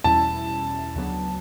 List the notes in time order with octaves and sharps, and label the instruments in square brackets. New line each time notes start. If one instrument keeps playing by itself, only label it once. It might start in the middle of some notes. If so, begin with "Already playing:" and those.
[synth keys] E2 B2 G3 C#4 E4 [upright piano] A5
[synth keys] D2 C#3 F#3 B3 D4